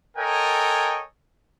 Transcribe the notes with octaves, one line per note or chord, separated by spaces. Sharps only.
A4 A#4 C#5 D#5 G5 G#5